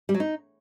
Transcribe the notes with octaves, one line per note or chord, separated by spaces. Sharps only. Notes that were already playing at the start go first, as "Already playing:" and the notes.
G3
F#3
D#4